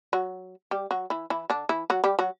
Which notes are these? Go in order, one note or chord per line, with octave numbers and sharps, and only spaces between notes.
F#3 F#4
G3 G4
F#3 F#4
E3 E4
E3 E4
D3 D4
E3 E4
F#3 F#4
G3 G4
F#3 F#4